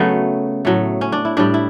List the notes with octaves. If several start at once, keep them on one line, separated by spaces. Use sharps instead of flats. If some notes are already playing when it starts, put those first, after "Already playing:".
Already playing: C#3 F#3 A3 B3
A2 F#3 A3
C#4
D4
E4
A2 G3 D4
E4